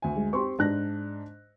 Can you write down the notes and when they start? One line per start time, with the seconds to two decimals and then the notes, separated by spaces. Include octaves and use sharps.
0.02 D2 G#5
0.16 G#3
0.33 C4 G4 C6 C#6
0.59 G#2 D4 F#6 A#6